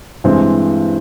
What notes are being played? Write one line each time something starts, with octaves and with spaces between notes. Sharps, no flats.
G2 E3 G#3 C4